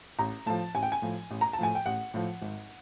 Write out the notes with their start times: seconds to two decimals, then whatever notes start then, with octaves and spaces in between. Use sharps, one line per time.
0.19 A1 A#5
0.46 A2 F3 A5
0.75 A1 G#5
0.83 G5
0.92 G#5
1.02 A2 F3
1.31 A1
1.41 A#5
1.53 A5
1.59 A2 F3 G#5
1.75 G5
1.86 A1 F#5
2.14 A2 F3
2.42 G#1